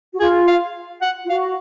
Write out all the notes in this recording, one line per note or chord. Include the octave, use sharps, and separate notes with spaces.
F#4
F4 G#4
F5
F#5
F4
F#4 F5